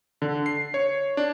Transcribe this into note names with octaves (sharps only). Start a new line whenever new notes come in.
D3
C7
C#5
D4